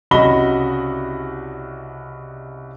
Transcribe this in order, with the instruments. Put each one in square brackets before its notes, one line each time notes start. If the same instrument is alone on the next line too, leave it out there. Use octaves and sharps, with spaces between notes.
[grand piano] C2 C#3 F#4 D#5 B5 G7